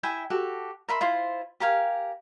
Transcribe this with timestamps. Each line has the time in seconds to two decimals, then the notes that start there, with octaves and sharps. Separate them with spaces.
0.03 E4 E5 G5 G#5
0.30 F#4 G4 A4
0.88 A#4 E5 B5 C6
1.01 E4 F4 C5
1.60 G4 A#4 F5 G#5